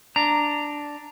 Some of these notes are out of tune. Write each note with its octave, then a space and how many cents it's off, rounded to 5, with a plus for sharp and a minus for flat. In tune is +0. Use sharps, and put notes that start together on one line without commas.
D4 +0 A#5 -10